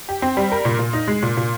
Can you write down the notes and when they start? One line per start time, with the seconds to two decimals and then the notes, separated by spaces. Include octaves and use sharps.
0.09 G4
0.22 C4
0.37 G3
0.52 A#4
0.65 A#2
0.79 A#2
0.93 D#4
1.08 G#3
1.23 A#2
1.37 A#2